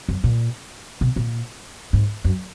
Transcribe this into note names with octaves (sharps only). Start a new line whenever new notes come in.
F#2
A#2
B2
A#2
G#2
F#2